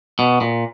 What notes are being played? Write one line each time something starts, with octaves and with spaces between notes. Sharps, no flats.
B2
A#2